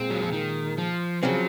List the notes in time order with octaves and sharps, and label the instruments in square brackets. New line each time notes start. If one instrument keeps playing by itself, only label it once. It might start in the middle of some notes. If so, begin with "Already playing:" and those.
Already playing: [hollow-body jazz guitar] A#2 G#3 F4 [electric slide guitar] C4
[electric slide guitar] F#3
F3
D#3
F3
[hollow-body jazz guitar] C#3 F3 C4 [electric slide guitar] F#3